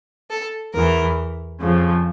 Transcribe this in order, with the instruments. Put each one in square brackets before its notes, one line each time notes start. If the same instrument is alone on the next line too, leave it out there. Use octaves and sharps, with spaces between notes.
[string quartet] A4
E2 E3 A#4
F2 C#3 F3